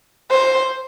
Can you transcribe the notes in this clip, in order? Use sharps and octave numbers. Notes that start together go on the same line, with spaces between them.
C5